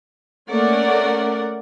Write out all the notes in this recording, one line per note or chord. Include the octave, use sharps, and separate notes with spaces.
A3 A#3 C#4 A#4 D5 F#5